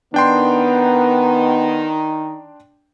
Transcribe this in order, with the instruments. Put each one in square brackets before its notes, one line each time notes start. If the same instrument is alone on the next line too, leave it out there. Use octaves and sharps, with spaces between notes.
[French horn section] D#3 [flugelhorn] B3 [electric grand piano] D4 G5 C6